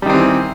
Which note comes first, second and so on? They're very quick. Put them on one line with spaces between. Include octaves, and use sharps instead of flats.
G3 D#3 C4 E3